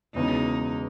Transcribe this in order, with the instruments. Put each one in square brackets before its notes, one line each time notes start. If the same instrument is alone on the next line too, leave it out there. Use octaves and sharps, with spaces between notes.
[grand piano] E1 E2 C#3 [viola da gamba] D#4